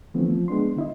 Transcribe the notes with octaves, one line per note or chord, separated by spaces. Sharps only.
D3 E3 F3 A3 B3 C4
F3
G#3 B3 D4 C6
D3 E4 D#5